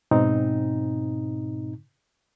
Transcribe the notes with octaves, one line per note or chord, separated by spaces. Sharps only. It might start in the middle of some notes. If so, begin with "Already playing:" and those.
G#2 B2 C4 D#4